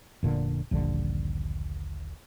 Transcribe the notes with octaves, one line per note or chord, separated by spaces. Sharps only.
F1 A#2 D3
D#1 A#1 G2 D3